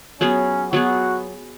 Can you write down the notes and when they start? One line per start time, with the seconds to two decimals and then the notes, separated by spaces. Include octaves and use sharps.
0.20 F#3 B3 C#4 G#4
0.72 F#3 B3 F#4 G#4